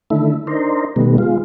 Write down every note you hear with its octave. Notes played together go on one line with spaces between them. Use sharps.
D3 D#3 A3 E4
D4 D#4 A#4 C5
B2 D#3 G3 A3 B3
G#3 F4